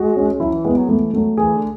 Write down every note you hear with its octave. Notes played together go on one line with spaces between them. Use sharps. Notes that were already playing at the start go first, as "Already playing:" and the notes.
Already playing: G#3 F#4
C#4
F#3 E4
E3
G#3 B3
F#3
E3 A3
F#3 A3
E3 G#4
D3